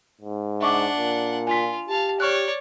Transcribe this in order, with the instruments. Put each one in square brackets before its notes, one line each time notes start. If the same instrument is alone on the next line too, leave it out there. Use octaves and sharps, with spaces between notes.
[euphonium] G#2
[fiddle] D4 F#5 [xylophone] E5 C#6 D6
[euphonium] A#2
[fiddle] F4 [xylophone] G#5 B6
[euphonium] G4 [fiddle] F5 A5
[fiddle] C#5 D5 [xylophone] C#6 F6 F#6